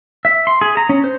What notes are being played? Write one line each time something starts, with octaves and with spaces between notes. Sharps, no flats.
E5
C6
G#4
A#5
C#4
C5